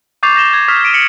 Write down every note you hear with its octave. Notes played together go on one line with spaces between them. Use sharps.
C#6 D6 G6 A6 C7 F7
G6 A#6 C7 E7 G7
G#6
C#6 D#6 F6 B6 C7
G6 B6 D7 D#7
B6 C#7 E7 F#7